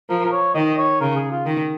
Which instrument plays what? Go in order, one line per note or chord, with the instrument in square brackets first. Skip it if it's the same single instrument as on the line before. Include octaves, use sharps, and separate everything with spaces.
[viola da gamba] F3 [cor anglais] A#4
[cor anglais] A#4
C#5
[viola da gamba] D#3 [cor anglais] D#5
[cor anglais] C#5
[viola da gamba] C#3 [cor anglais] A#4
[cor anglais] G#4
F4
[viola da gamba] D#3